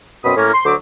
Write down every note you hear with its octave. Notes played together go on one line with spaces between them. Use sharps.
F#2 B2 C4 B5 D#6
A2 A#3 C#4 A#4
C6
D2 D3 F#3 C5 D6